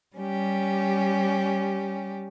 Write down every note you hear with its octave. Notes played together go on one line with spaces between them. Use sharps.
G3 C#4 G4